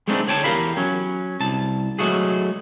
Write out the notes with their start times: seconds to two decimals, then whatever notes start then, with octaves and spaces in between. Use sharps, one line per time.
0.08 G#3 A3 B3 C4 D4 D#4
0.28 D3 C#5 G5 A5
0.44 E2 G4 A#4 F5 B5
0.77 F#3 C#4
1.40 C2 A5
1.99 F#3 G#3 A3 F#4 G#4